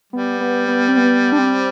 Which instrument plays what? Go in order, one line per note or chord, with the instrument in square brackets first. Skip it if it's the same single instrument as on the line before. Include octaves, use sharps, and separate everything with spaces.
[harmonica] G3 [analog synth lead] B3
[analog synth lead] B3
B3
C4
B3
D4
C4